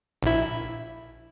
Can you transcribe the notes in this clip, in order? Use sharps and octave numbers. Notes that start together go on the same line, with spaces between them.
A#1 E4